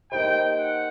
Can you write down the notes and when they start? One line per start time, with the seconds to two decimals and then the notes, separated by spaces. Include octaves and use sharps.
0.12 A#3 D#4 G4 C5 G5
0.59 F#5